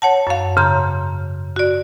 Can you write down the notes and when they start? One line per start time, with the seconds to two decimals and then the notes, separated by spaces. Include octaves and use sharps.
0.02 C#5 F#5 A5
0.27 F#2 F5
0.56 G#2 C#3 A#5 C6 G6
1.56 F#4 D5